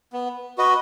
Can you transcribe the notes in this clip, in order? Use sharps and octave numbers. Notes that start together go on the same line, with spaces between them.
B3
F#4 B4 D#5